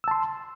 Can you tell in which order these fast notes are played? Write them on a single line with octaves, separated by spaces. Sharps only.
E6 A5 C6